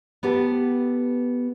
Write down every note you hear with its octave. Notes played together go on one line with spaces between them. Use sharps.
B3 G4 A4 B4